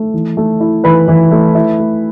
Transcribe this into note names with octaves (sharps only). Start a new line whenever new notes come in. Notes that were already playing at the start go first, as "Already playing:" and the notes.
Already playing: A3
E3
A3
E4
E3 B4 B5
E3
A3
E4
A3